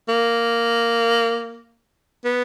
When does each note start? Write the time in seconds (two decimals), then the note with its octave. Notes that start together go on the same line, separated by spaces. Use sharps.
0.09 A#3
2.25 B3